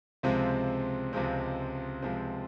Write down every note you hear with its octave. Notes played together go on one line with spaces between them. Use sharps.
C#2 C3 F3 G#3 C4
C#2 C3 F3 G#3 C4
C#2 C3 F3 G#3 C4